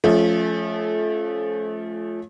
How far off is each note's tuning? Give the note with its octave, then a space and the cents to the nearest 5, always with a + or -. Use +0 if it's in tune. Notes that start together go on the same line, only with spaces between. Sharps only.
F3 +0 A3 -30 C#4 +0